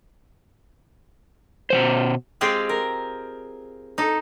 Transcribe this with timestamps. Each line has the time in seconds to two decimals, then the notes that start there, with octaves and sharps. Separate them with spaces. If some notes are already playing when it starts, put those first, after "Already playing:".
1.70 B2 D#3 C5
2.41 G#3 C4 F4 G4 G#4
2.69 A#4
3.98 D#4 A4